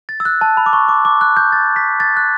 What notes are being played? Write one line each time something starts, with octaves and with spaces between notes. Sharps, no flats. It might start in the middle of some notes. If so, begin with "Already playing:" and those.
A6
E6
F#6
A5
B5
D6
C#6
D6
D6
F#6
G6
A6
B6
A6
F#6